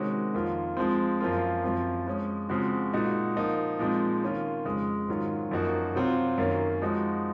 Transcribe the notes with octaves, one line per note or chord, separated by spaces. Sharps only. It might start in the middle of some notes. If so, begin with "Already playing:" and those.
Already playing: C3 D#3 G#3 C#4 F#4
F2 D#3 A#3 F4
F3 G#3 C4
F#2 F3 A#3 F4
F#2 F3 C4 F4
F3 G#3 C#4
C#3 F3 G#3 C4 F#4
A#2 G#3 D#4 F#4
F3 A#3 D#4
A#2 F3 G#3 C4 D#4
D#3 A#3 C#4 F4
F2 C#3 G#3
G#2 D#3 F#3 C#4 F4
F#2 F3 A#3 D#4 F#4
C3 F#3 C4 F4
F#2 D#3 A#3 C#4
F3 G#3 D#4 F#4